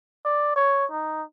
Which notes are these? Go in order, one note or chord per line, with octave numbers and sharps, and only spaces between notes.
D5
C#5
D#4